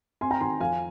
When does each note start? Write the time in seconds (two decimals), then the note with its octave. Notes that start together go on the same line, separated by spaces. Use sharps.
0.21 C4 G#5 C6
0.31 G5 A#5
0.40 D#3 G#5 C6
0.60 F2 F5 G#5